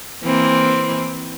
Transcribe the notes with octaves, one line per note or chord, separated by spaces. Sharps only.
E3 A#3 C4